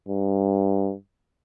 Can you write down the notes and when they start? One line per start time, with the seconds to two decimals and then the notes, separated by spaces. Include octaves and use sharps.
0.09 G2